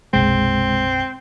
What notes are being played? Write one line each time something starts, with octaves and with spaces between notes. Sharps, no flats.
F#1 B1 C3 G#3 C4